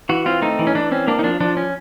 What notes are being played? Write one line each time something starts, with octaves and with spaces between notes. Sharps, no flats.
E3 F#4
C4 F4
A3 D#4
E3
C#4
E3 D4
C4 C#4
A#3 D4
D#4
F3 D4
F3 D4
C#4